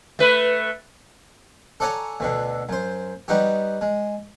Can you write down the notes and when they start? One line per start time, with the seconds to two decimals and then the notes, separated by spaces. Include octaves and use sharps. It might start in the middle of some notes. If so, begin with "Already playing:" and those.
0.19 A3 B4
1.80 A4 C#5 D5 F#5 G#5 A#5
2.20 D2 B2 D3
2.69 F#2 C5
3.28 G3 B3 D#4 F#4 G4
3.81 G#3